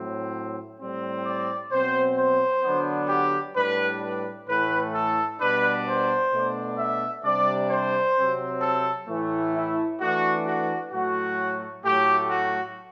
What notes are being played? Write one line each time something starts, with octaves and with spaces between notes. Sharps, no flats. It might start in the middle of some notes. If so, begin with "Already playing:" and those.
Already playing: A2 F#3 C4
A2 G3 C4
D5
B2 F#3 C4 C5
C5
D3 F#3 B3 D4
G4
A2 G3 D4 B4
B4
A2 E3 A3 B4
A4
B2 G3 D4 B4
C5
B2 A3 D4
E5
C3 G3 D4 D5
C5
C3 F#3 C4
A4
A2 E3 A3
E4
E3 A3 D4 F#4
F#4
A2 F#3 A3 F#4
A2 F#3 A3 G4
F#4